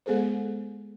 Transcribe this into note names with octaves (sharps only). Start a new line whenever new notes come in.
G#3 B3 G#4 A4 C5